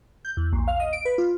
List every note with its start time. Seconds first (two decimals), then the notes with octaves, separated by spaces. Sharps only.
0.25 G6
0.37 E2
0.52 A#1
0.68 F5
0.80 D#5
0.93 D7
1.05 B4
1.18 F4